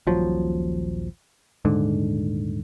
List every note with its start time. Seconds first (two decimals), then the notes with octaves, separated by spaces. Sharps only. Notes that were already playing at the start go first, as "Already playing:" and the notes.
0.07 D#1 A#1 F3 F#3
1.65 D#1 G#2 D3